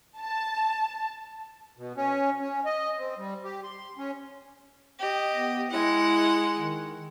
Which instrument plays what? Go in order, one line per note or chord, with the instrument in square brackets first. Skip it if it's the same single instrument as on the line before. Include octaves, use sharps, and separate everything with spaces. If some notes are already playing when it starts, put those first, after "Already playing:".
[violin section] A5
[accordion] B2
C#4
C#4
D#5
C4
G3
G4
C6
C#4
[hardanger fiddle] G4 D#5
[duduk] B3
[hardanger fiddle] G#3 F#5 [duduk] E4
[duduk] D#3